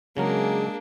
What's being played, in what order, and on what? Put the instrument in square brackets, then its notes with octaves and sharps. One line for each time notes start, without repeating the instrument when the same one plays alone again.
[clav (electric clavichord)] C#3 F#3 A#4 [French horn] G#3 [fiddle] A#3 D4 [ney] G#4